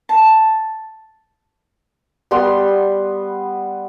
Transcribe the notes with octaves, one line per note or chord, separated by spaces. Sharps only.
A5
G3 B3 C6